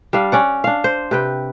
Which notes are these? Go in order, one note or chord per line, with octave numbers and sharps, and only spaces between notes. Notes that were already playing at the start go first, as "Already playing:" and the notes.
G3 D4 F5
C#4 D5 F#5
D4 F5
C5
C3 B4 G5